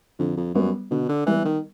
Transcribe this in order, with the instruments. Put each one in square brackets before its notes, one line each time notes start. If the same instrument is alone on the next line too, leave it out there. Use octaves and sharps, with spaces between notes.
[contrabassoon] F2 [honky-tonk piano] D3
[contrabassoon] F2
[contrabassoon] F#2 [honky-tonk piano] G3 B3
[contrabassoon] B2 [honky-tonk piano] D3
[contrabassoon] D3
[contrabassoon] E3 [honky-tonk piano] G3 B3
[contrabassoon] D#3